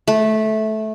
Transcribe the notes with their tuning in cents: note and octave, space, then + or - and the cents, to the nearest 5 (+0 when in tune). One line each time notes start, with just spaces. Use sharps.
A3 -15